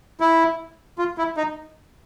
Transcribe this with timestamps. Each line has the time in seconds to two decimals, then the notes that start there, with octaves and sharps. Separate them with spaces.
0.20 E4
0.98 F4
1.18 E4
1.37 D#4